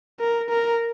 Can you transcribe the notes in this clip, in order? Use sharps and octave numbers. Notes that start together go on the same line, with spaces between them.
A#4
A#4